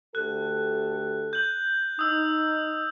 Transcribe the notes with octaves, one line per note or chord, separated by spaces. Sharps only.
D2 G4 A4 F#6
G6 F#7
D#4 D#6 E6